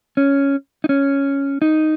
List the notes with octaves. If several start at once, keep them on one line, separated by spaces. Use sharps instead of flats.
C#4
D#4
C#4
D#4